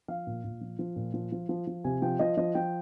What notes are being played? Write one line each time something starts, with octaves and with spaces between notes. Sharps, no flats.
F3 F5
A#2
A#2
F3
F3
A#2
F3
F3
F3
F3
C3 G#5
F3 G5
F3 D#5
F3 D#5
F3 G5